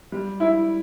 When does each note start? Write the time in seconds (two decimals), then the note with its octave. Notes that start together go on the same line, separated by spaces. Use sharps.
0.12 G3
0.40 E4